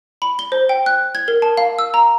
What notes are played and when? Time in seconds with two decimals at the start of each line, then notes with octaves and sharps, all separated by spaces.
0.22 B5
0.39 G7
0.52 C5
0.69 G5
0.86 F#6
1.15 G#6
1.28 A#4
1.42 A5
1.57 F5
1.79 E6
1.94 A#5